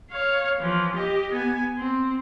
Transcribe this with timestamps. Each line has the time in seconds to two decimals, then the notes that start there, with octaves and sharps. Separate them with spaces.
0.11 C#5 F5
0.60 E3 F3
0.96 G4 D#5
1.32 B3 G#5
1.78 C4